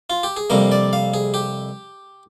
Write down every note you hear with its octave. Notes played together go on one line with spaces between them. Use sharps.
F4
G4
G#4
F2 C3 G3 A#3 A#4
D5
F5
G#4
G4